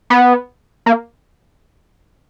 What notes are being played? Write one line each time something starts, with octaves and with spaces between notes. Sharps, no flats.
B3
A#3